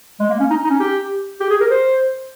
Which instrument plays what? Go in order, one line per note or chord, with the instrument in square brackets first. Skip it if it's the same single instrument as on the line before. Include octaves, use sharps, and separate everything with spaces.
[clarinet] G#3
A#3
C#4
D#4
D#4
C#4
G4
G4
G#4
A#4
C5